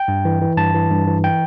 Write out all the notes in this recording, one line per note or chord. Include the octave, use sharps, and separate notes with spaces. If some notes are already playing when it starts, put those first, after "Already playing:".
Already playing: G5
G2
E3
E3
G2 A5
E3
G2
E3
G5